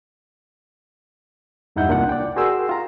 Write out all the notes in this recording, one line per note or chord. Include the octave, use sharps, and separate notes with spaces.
E2 G2 D#4 E4 F#5 G6
C2 A#3 D4 F4 F#5
D5 G5
F#4 G#4 A#4 G5 C6 E6
F4 A#5